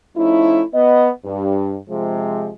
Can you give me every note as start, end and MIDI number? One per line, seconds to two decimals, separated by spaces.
0.17 0.62 53
0.17 0.62 57
0.17 0.62 61
0.17 0.62 63
0.17 0.62 64
0.74 1.09 59
0.74 1.09 75
1.25 1.77 43
1.90 2.51 48
1.90 2.51 53
1.90 2.51 56